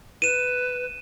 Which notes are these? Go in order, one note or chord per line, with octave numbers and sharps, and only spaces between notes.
B4 D#7 E7